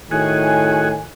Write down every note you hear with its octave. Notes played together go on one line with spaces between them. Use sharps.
A2 D#3 F#4 G#4 G#5